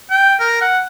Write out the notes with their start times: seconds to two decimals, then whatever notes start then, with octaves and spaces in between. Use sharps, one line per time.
0.11 G5
0.40 A#4
0.61 F#5